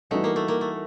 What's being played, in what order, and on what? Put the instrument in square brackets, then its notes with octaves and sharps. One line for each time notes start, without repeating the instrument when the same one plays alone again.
[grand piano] E3 G3 B3 D#4 F#4 [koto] A3
[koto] A#3
A3
A#3
A3